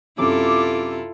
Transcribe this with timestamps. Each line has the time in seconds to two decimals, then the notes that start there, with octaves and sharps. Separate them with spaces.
0.18 F#2 C3 E4 F4 A4 D6